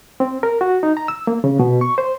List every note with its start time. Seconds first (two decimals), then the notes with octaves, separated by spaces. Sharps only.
0.20 C4
0.43 A#4
0.61 F#4
0.83 D#4
0.97 A#5
1.08 E6
1.27 A#3
1.44 C#3
1.59 B2
1.81 C#6
1.98 C5